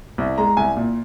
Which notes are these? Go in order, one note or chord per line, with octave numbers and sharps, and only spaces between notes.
C2
G#3 A#5
C2 G#5
A#2